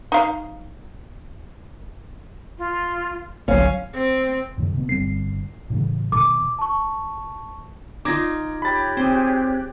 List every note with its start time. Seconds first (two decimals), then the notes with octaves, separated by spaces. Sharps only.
0.12 D#4 F5
2.58 F4
3.48 G1 C2 F#3 C#4 F5
3.95 C4
4.58 F#2 C3 D#3
4.76 C3 B3
4.89 G1 G3 C4 C7
5.70 A2 C#3 E3
6.12 B2 D#3 D6
6.59 A5 C#6
8.05 D#4 F4 D6 G#6 A#6
8.62 G4 C#5 B5 F#6 A6
8.97 C4 G#4 C5